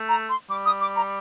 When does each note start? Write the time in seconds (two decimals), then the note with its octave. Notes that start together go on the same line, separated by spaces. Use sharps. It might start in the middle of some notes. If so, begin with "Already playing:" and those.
Already playing: A3
0.09 A#5
0.29 C6
0.50 G3 D6
0.66 D#6
0.81 D6
0.96 A#5